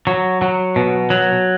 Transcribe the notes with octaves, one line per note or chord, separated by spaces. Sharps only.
F#3
F#3
B2
F#3